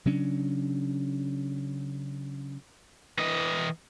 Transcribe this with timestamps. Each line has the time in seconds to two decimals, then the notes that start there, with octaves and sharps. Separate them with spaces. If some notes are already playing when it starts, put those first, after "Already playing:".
0.05 C#3 F#3 C#4 D4
3.19 E3 D#5